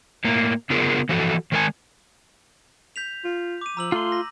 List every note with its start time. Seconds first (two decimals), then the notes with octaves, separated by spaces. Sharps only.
0.24 A2 A#3
0.70 C#3 B3 F4 G#4 A#4
1.09 E3 F3 F#4 A4
1.52 D#3 G#3 A#4 C#5 G#5 A5
2.96 G6 B6 F7
3.24 F4
3.61 D6 D#7
3.77 F3 A#5 E6 F#7
3.92 A3 F4 C6
4.12 A#6